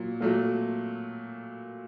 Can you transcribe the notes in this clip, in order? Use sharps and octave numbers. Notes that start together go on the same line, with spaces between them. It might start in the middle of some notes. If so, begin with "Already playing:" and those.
Already playing: A#2 F#3
A#2 F#3 A3